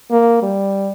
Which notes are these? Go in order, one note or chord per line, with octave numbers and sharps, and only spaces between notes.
A#3
G3